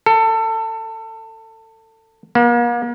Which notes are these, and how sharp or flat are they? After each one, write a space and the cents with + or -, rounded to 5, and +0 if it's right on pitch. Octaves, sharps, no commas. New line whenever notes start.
A4 +25
A#3 +40